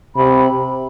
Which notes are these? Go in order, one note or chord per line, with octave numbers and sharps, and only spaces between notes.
C3 B5